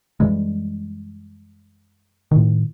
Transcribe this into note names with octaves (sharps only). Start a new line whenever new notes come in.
F#2 E3 G3 G#3
A2 D#3